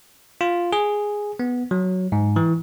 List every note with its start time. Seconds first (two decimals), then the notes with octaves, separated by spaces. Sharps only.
0.41 F4
0.73 G#4
1.39 B3
1.71 F#3
2.12 G#2
2.36 E3